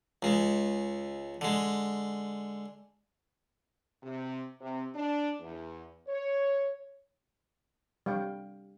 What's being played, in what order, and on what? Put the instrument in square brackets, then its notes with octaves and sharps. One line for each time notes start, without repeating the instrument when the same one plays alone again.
[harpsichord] C#2 G#3
D3 G#3
[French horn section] C3
C3
D4
E2
C#5
[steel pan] G3 F5 G5